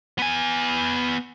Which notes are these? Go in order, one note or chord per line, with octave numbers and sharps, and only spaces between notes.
B3 G#5